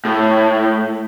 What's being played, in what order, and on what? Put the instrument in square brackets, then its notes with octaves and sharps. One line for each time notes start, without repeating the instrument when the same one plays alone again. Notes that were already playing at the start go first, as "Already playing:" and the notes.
[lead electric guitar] A2